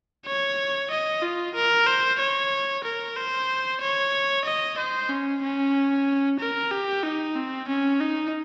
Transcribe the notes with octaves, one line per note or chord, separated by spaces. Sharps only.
C#5
D#5
F4
A#4
C5
C#5
A#4
C5
C#5
D#5
C5
C#4
C#4
A#4
G4
D#4
C4
C#4
D#4